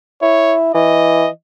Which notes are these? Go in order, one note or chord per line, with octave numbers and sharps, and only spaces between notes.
E4 C#5
E3 D#5